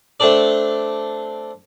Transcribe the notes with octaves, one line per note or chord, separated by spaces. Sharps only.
A3 C4 D4 A4 D5